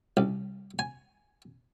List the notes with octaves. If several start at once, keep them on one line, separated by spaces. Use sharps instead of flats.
C2
G#5